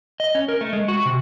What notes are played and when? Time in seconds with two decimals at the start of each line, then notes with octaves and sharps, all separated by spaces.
0.20 D#5
0.35 C#4
0.48 A#4
0.61 A3
0.73 G#3
0.88 F#4
1.05 C3